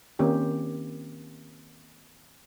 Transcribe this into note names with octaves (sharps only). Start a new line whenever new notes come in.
D#3 A#3 C4 C#4 G4